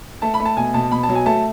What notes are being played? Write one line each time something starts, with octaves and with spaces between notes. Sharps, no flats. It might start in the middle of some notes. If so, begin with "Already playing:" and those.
A3 A5
B5
A3
A5
B2 G#5
B2 A5
B2 B5
A5
F#3
G#5
A3 A5